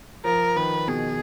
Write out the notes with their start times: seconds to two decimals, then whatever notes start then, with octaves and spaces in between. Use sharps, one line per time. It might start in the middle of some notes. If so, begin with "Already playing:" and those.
0.24 F3 A#4
0.56 D#3 B4
0.88 B2 G#4